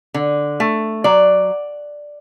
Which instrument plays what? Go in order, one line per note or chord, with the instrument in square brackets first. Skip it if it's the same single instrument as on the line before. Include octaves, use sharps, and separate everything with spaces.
[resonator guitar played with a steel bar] D3
A3
F#3 D5